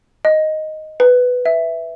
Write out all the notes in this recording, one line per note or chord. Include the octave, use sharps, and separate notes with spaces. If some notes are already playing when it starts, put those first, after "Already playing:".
D#5
B4
E5